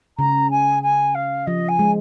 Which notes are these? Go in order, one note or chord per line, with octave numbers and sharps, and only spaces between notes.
C#3 A#5
G#5
G#5
F5
F3 D#5
G#5
G#3